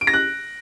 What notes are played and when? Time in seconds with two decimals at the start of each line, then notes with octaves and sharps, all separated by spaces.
0.01 D7
0.07 A#6
0.13 F#6